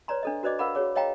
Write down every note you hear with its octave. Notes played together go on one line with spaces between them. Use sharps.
B4 C#5 D5 A#5 C6
D4 A4 D#5
F#4 B4 C5 D5 D#5 D6
A#4 B4 F5 F#5 B5 D6
F#4 G#4 C#5 D6
C#5 D#5 F5 G5 A#5